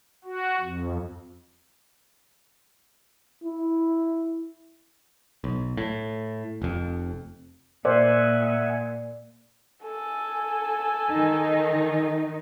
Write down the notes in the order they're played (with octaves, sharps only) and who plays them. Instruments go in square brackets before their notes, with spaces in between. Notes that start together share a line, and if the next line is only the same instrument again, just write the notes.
[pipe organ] F#4
F2
[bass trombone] E4
[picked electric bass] B1
A2
F1 F2
[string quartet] A#2 [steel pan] A#4 C5 [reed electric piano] D5 [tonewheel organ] E5 F#5 G#5
[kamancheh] A4 G#5
[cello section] D#3 D#4